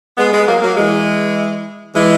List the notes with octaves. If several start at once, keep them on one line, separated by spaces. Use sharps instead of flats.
G#3 B3
G#3 B3
F#3 A#3
F#3 A#3
E3 G#3
E3 G#3